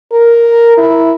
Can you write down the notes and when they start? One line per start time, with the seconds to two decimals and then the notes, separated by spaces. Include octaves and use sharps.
0.12 A#4
0.78 E4